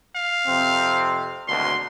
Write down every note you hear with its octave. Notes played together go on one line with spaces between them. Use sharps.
F5
F2 C3 C4
G#1 D2 B2 C6